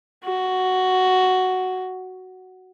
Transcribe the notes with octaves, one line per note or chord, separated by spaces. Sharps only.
F#4